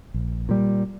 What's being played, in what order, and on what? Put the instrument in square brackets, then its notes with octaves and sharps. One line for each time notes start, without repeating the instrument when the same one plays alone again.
[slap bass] A#1
A#2 G3